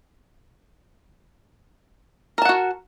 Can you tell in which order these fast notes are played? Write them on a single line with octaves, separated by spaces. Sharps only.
A#4 A5 F#5 F#4